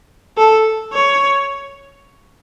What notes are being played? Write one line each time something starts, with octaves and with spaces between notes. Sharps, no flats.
A4
C#5